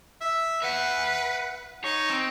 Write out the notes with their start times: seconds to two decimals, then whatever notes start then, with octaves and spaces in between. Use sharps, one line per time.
0.21 E5
0.62 B4 E5 F#5
1.84 D#4 C#5
2.10 C4